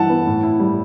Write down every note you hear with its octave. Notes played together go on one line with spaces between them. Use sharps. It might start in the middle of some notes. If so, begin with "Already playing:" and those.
Already playing: G2 E3 E4 F#5 A5
B3
A2
E4
G3